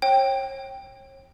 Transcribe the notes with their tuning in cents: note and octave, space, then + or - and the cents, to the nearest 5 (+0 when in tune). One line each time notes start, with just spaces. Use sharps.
C#5 -40 G5 +0